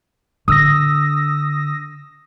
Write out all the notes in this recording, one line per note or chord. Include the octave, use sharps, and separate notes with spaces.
D3 D#6 E6 A#6